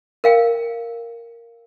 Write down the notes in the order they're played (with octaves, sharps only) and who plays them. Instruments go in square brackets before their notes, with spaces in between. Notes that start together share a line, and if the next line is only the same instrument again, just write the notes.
[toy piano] A#4 F5 G5